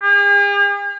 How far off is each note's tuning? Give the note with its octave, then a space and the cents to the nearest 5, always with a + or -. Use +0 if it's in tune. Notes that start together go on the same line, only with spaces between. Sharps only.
G#4 -45